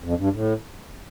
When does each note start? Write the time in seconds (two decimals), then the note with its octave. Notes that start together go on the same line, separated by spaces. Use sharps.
0.04 F2
0.19 G2
0.33 A2